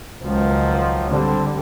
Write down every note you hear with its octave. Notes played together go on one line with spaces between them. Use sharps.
C#2 D#3 F3 F#3
D3 G3 C4 D4